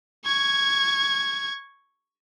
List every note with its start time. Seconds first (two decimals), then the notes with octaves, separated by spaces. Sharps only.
0.25 C#6 G#6